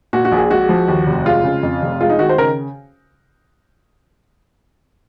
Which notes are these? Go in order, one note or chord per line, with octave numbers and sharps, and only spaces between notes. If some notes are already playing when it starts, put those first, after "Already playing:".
A#2 F#4
F#4
A#1
G#4
G#3 F#4
F3
D#2
F1
G#3 F4
C#3
F2
F1
G#3 F4
D#4
D#3 F#4
C5
C#3 A#4